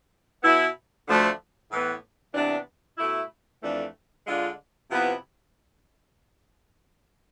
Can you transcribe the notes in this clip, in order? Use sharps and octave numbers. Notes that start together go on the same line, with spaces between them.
B2 B3 E4
D2 D3 F3 A3 D4
A2 E3 B3
C3 E3 B3 D4
B2 A3 E4
F2 E3 A3 D4
D3 G#3 D4 F4
C3 F3 B3 E4